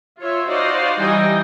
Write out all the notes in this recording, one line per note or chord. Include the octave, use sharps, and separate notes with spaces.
F4 C#5 E5
D#4 F#4 C5 D5 D#5 F5
E3 G3 D#4 D#5 G5 G#5